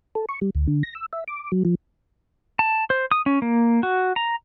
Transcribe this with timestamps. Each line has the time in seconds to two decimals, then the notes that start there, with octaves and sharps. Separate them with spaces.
0.15 A4
0.29 C#6
0.41 G3
0.55 D2
0.67 D3
0.83 A#6
0.95 E6
1.13 E5
1.28 D6
1.52 F#3
1.65 F3
2.59 A5
2.90 C5
3.11 D#6
3.26 C#4
3.42 A#3
3.83 F#4
4.16 A#5